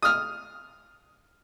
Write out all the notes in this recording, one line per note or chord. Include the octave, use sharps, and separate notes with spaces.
D#6 F6